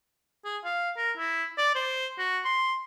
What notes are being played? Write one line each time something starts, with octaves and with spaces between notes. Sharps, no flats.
G#4
F5
A#4
E4
D5
C5
F#4
C6